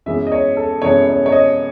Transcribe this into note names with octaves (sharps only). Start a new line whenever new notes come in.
F#2 E3 G#3 B3 E5
D#5
C#5
A4
F#2 E3 G#3 B3 C#5
C#5
C#5
D#5